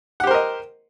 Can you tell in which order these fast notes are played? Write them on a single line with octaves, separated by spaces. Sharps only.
F#5 G4 C5 A#4 D#5